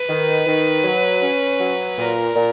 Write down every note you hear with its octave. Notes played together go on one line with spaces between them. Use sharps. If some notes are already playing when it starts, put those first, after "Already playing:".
Already playing: B4
D#3
D#3
F#3
C#4
F#3
A#2 A#4
A#2